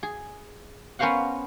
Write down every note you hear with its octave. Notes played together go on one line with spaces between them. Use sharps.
G#4
B3 C#4 A#4 C5 F5 F#5